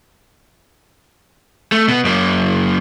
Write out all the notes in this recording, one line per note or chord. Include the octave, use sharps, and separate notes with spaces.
A3
B2 B3
F#2 A#3